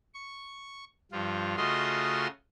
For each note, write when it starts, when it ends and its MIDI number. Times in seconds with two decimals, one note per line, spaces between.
0.14 0.84 85
1.12 1.56 43
1.12 1.56 53
1.12 1.56 65
1.57 2.27 49
1.57 2.27 57
1.57 2.27 65
1.57 2.27 66
1.57 2.27 75
1.57 2.27 84